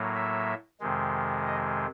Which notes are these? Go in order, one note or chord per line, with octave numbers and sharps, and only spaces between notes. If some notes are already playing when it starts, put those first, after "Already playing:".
Already playing: A2 F#3 A#3
E5
F2 C3 D#3 G#3
D#5